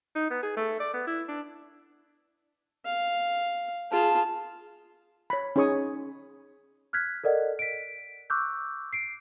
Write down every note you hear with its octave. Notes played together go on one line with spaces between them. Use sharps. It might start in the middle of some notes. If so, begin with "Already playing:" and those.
D#4
B3
G#4
A3
D5
B3
E4
D4
F5
F4 G#4 A5
C#5 B5
C#4 D#4 G#4 C#5 C#6 D#6
F6 F#6 G#6 B6
A4 A#4 D5 D#5 F#5
B6 D7
C#6 D6 E6 F#6 G6
C7 D7